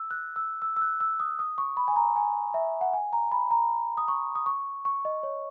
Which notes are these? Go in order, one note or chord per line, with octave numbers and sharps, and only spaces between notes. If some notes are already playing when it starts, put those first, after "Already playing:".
Already playing: E6
F#6
E6
E6
E6
F#6
E6
D#6
D#6
C#6
B5
G#5
A#5
G#5
E5
F#5
G#5
A#5
B5
A#5
D#6
C#6
D#6
C#6
C#6
D#5
C#5